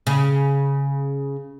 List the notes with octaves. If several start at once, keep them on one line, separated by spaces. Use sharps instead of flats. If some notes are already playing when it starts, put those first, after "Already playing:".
C#3